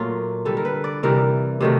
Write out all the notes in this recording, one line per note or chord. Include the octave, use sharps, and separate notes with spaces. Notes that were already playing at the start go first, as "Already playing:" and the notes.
Already playing: A#2 F#3 A3 F4
D3 G3 A4
A#4
B4
D5
C3 E3 G3 A#4
C3 D#3 F#3 A3